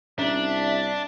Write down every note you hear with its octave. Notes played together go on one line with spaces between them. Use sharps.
C2 C#4 D4 E5